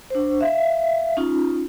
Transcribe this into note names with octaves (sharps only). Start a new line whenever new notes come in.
D4 C5
E5 F5
C#4 D#4 F4